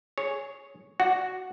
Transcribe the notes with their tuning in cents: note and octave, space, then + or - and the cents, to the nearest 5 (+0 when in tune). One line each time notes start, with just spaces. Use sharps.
G#4 +0 C#5 +0
F#4 +0 D5 +0 F#5 +0